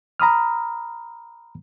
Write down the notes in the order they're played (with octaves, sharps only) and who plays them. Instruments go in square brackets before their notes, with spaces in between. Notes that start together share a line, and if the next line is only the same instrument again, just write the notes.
[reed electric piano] A#5 B5 D#6 F6